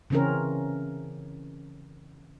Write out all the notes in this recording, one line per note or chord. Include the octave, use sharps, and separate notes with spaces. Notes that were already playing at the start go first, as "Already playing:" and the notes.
C#3 E3 C4 C#4 A#4